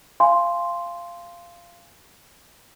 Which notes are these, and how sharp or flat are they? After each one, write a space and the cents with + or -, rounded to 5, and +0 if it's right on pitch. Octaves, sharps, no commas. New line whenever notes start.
F5 -15 G#5 +0 C6 +0